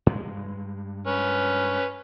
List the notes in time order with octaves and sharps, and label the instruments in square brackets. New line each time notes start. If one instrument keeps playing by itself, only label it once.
[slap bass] G2 G#3
[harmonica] C#4 B4